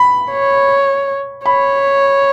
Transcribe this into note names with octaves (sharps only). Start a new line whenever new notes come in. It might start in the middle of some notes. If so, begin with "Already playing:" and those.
Already playing: B5
C#5
C#5 B5